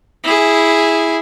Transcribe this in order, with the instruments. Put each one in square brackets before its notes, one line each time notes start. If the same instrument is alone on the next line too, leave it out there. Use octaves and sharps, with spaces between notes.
[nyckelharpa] E4 G#4